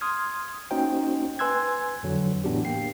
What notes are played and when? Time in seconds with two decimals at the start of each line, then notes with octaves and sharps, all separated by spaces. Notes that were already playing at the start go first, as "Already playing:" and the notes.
0.01 C6 D#6 F6 G#6
0.71 A#3 C#4 D#4 F#4 C5 G5
1.39 B4 G#5 C6 E6 F#6 G#6
2.03 F2 D3 F#3
2.44 A2 E3 B3 D4 F#4 G4
2.65 A#3 G5 C7